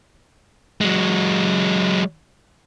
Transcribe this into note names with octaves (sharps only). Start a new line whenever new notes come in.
F#3 G#3